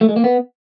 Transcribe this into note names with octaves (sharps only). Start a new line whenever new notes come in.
A3
G#3
A#3
B3